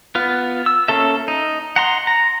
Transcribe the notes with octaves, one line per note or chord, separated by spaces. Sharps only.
B3 F4
E6
A#3 C#4 A4 E5
D#4
F#5 A#5 C6
A#5